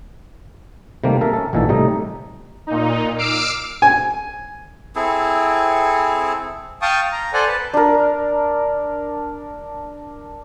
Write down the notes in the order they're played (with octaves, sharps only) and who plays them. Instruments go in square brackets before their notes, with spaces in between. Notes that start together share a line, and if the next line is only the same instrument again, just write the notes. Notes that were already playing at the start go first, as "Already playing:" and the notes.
[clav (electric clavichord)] C3 D#3 G3 A3 A#3 C4
A4 A#4 E5
C#4 A4
A1 A#2 D#3 E3 A4
C3 G3 A3 D#4 A#5
[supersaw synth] A#2 D#4
D6 E6 F6 C7 D7
[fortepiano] G#5
[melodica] C4 E4 G#4 A4
[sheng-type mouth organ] F5 G5 A5 C#6 D#6
A#5
A4 C5 D5 F#5 G#5
B4 A5
[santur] D4 A#4